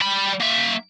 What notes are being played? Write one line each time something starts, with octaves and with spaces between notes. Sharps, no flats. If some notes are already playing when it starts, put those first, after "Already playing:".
G3 B5
A#3 E5